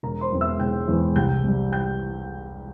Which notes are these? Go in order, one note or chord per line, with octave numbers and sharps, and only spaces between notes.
E1 A#4 A#5
C5 C6
E2 E3 G#3 C4
E5 E6
E1 G5 G6
E2 E3 G#3 C4
C2 G5 G6
C3 G3
G5 G6